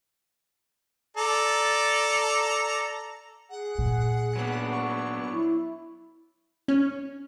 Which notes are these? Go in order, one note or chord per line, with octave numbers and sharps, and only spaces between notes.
A4 D5 A#5
G#4 F#5
A#2
F#3 B3 D4
C#6
E4
C#4